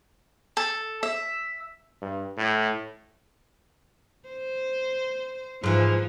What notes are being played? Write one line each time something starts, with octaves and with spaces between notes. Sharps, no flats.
A4
E5
G2
A2
C5
G#2 E3 F3